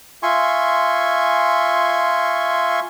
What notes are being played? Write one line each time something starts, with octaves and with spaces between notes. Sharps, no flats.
F4 E5 G#5 C6 C#6